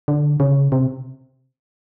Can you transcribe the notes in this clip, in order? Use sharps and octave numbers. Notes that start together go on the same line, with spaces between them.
D3
C#3
C3